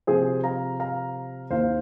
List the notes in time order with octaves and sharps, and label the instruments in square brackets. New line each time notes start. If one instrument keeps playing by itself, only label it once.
[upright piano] C3 F3 C4 G#4 C5
F5 A#5
F5 A#5
D#2 D#3 A#3 C5 F5